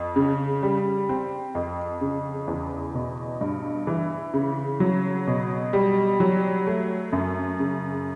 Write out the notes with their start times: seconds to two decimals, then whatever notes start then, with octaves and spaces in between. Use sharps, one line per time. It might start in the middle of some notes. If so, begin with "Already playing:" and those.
Already playing: F2
0.16 C#3
0.63 G3
1.09 C4
1.55 F2
2.01 C#3
2.48 E2
2.94 B2
3.41 G2
3.87 E3
4.34 C#3
4.80 F#3
5.27 B2
5.73 G3
6.20 F#3
6.67 A3
7.13 F#2
7.60 C#3